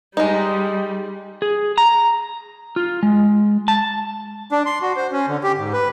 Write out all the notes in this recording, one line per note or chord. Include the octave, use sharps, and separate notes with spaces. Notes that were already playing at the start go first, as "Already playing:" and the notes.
G3 G#3 D#4
G#4
A#5
F4
G#3
A5
D4
C6
F#4
C5
C#4
D3
G4
G#2
B4